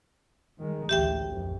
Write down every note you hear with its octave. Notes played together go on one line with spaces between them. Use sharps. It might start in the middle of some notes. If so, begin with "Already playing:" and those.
D#3 G#3
A1 D2 G4 E5 G5
A#1 F2